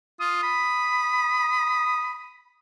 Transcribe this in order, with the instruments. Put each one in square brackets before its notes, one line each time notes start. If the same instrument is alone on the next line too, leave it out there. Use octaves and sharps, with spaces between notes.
[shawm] F4 [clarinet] D#6
[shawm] B5